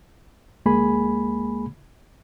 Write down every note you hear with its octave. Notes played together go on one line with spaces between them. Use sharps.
D2 G#3 A#3 G#4 G#5 B5